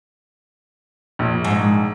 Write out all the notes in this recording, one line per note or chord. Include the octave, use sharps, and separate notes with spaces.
A#1
G#2